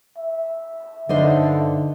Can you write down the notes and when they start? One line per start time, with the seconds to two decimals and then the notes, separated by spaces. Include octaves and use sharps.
0.18 E5
1.09 G2 D3 D4 D#4 C5